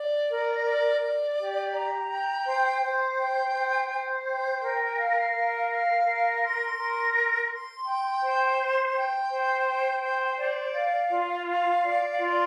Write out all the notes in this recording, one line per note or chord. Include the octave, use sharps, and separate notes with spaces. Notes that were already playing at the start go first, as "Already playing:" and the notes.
Already playing: D5
A#4
D5
D5
G4
A#5
G5
C5
C5
G5
C5
C5
G5
A#4
F5
A#4
F5
A#4
C6
A#4
C6
C6
G5
C5
C6
G5
C5
G5
C5
D5
F5
F4
F5
D5
F4